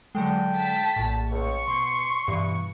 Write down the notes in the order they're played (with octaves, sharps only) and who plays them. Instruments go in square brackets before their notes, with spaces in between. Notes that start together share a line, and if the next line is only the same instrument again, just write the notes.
[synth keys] D3 F#3 G#3 [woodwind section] A4 G5
[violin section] A5 B6
[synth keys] A#1 A2
[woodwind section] C#2 [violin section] C#6
[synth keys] B2 [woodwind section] C6
[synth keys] G2 B2 E3